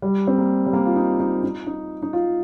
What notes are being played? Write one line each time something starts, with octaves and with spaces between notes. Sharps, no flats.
G3
C4
A#3
G3
A#3
F4
D#4
D#4
D#4
D#4
D#4
F4